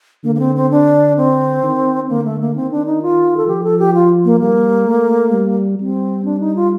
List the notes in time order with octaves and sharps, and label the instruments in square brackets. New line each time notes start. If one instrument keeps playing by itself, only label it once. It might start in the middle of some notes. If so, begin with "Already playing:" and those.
[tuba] D3 [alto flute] A#3
[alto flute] A#3
C4
C4
D4
C4
[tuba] D#3
[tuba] D3 [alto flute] A#3
[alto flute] A3
A#3
[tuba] D#3 [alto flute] C4
[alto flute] D4
D#4
F4
A4
[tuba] F3 [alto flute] G4
[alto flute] A4
G4
F4
A#3
[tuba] G3 [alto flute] A#3
[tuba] A3
G3
[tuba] G3 [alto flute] C4
[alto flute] D4
D#4
F4